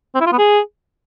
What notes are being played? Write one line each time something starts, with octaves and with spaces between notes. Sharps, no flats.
C4
E4
F4
B3
G#4